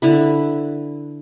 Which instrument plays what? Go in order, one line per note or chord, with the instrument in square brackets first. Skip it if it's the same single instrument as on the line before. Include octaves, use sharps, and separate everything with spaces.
[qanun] D3 E4 B4